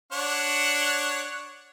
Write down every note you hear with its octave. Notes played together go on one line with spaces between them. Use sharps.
D4 C#5 F#5